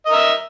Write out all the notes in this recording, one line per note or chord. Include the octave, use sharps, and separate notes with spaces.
A#4 D#5 E5